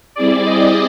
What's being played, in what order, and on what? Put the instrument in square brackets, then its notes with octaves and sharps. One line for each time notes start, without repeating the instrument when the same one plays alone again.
[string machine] G3 C4 E4 G#4 [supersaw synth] D5
[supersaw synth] D#5